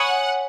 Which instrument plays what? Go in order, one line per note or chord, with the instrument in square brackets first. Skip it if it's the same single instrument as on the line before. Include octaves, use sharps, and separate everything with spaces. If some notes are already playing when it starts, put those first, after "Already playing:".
Already playing: [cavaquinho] C#5 G#5 B5 D#6 [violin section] F#5